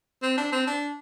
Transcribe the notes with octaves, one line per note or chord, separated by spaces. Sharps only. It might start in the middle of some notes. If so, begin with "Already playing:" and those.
C4
D4
C4
D4